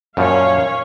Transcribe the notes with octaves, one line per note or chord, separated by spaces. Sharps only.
F#2 A#2 F3 C#4 C#5 F5